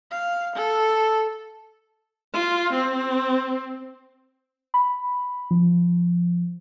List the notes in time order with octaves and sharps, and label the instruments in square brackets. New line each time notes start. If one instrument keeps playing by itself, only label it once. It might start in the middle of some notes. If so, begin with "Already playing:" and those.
[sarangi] F5
A4
[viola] F4
C4
[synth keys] B5
F3